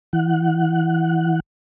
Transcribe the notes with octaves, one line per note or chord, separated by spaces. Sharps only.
E3 F#5